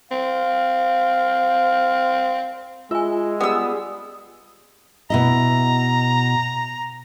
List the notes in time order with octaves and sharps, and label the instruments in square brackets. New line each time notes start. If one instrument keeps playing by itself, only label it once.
[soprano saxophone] C4 [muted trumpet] F5
[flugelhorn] G#3 [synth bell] F4 G#5 [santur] E5
[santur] G3 G#4 D#6 [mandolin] B3 E6
[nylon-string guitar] B2 E4 D#5 [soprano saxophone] A#5